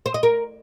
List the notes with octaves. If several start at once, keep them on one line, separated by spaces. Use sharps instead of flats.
C5
D#5
A#4